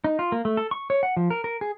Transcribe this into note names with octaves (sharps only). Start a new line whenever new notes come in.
D#4
F4
A#3
A3
A4
C#6
C#5
F#5
F3
A#4
A#4
G#4